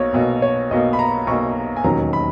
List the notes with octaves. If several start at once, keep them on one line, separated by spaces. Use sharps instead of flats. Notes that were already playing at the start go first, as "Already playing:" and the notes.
Already playing: B1 B2 A#3 C#5
B1 B2 A#3
C#5
B1 B2 A#3 D#5
B5
A#5
B1 B2 A#3 C#6
G#5
E1 D#2 D#3 F#3 C#4 A#5
B5